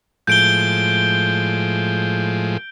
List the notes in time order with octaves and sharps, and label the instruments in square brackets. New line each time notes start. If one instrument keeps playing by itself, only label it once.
[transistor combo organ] A2 F3 G#3 [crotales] G6 D7 G7